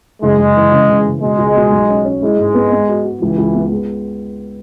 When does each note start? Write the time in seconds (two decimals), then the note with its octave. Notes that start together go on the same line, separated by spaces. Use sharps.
0.22 F#1 G#3
0.38 F#1
0.56 E3
0.72 C#3
0.89 C#3
1.06 C#3
1.21 B2 G#3
1.38 C#2
1.55 B2
1.72 B1
1.89 C#4
2.05 C#4
2.22 G#3 E4
2.38 G#2
2.54 B3
2.71 B3
2.88 F#4
3.05 F#4
3.21 C#2 E3
3.38 C#2
3.54 B3
3.72 G#3